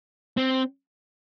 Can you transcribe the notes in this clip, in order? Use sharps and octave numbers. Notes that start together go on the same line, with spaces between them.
C4